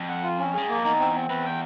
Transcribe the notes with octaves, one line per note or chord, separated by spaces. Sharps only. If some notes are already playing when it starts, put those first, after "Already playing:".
Already playing: F2
F#5
F4
C#4
G2 G#4
F#2 A#3
F2
E2 D#4
C4
C4
E2 B4
G5